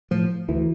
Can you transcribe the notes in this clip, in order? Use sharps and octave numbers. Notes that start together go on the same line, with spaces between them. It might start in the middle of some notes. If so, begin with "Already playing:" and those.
A2 F3
D2 E3